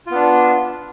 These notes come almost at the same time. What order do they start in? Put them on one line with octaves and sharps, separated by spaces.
F4 B3 D4